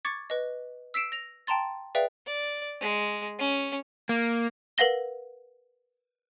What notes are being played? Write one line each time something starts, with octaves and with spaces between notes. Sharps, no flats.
C#6 D6 G#6 A6 C#7
B4 D#5
E6 B6 C7 D7 E7
A#6 F7
G5 A5 A#5 C6 A6
G#4 B4 D5 E5 F5 G5
D5
G#3
C#4
A#3
A#4 B4 F5 F#5 A#6 G7